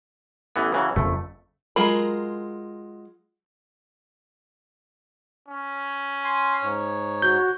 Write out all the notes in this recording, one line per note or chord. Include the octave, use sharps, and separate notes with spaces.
A1 E3 B3
C#3 E3 F#3
F#1 F2 A3
F#3 G#3 F4 A#4 B5
C#4
G#5 C6
G#2 C#5
F#4 G6